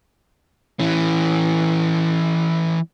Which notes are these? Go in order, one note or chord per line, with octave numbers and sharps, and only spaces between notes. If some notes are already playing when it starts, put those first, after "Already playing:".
E3 C#4